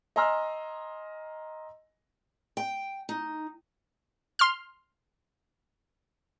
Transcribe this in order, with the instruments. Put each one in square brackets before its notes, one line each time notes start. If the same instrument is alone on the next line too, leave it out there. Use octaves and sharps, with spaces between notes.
[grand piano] D#5 G#5 A#5 C6 E6 F6
[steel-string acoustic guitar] G5
D#4
[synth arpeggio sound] C6 F6